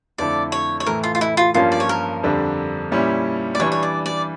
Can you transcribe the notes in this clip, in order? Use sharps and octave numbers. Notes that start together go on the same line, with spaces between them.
F2 D3 A3 E4 A4 D5
C#5
C#5
A2 E3 A3 A#4
F4
F4
E4
F4
G2 F3 A#3 C#4 F4
D5
C#5
A#4
F2 D3 G3 D4
A#2 G3 C#4 E4
D5
E3 G3 D4 C#5
C#5
D5
D5